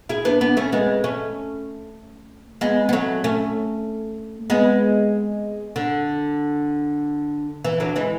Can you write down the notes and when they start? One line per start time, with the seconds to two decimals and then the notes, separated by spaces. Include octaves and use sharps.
0.09 E4 G#4
0.25 B3 D4
0.41 B3 D4
0.57 A3 C#4
0.72 G#3 B3
1.04 A3 C#4
2.61 G#3 B3
2.89 B3
2.93 F#3 A3
3.24 A3 C#4
4.50 G#3 B3
5.76 D3
7.64 E3
7.80 D3 F#3
7.96 E3 G#3